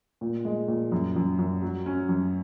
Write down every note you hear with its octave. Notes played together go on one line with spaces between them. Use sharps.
A#2
G#3
A#2
F#2
F#2
F#2
F#3
C#4
F#2